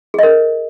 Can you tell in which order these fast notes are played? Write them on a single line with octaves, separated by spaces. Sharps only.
G#4 D#5 A#4